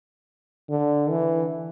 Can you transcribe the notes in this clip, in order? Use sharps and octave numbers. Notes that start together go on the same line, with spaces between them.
D3
E3